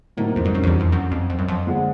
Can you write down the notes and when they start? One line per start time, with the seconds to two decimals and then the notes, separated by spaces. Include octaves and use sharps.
0.17 A2 C3 D#3 F#3 A#3 D#4
0.36 F2
0.45 G2
0.54 F#2
0.63 F2
0.67 E2
0.80 F2
0.92 F#2
1.11 F2
1.30 F2
1.39 F#2
1.48 F2
1.67 D3 F3 G#3